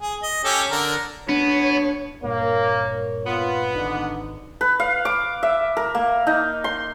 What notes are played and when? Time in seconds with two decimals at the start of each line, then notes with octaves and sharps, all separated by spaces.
0.01 G#4
0.23 D#5
0.44 C#4 G4 A4
0.71 D3 A#4
1.29 B3 D4 C#5
2.24 G2 A#2 A#3 A#4 C#5
3.26 B3 F4
3.74 G#1 D3 D#4
4.61 B4
4.80 F5
5.05 D6
5.43 E5
5.77 A#4
5.95 A#3
6.27 D#4
6.64 C6